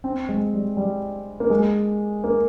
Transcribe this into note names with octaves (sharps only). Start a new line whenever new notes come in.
C4
G#3
G3
G3
A#3
G#3
A#3